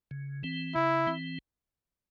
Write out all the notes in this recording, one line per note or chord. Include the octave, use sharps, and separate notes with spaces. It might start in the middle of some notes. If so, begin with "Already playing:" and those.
C#3
E3 C4
C#3 E4
E3 C4